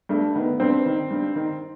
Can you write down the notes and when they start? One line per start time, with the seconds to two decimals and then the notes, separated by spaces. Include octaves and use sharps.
0.09 G2 A3
0.34 D#3 B3
0.60 G2 C4
0.86 D#3
1.11 G2
1.35 D#3